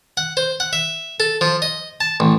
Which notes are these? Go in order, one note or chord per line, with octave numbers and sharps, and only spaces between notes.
F#5
C5
F#5
E5
A4
F3
D#5
A5
A1